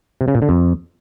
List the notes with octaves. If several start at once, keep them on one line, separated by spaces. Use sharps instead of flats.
C3
C#3
A#2
D3
F2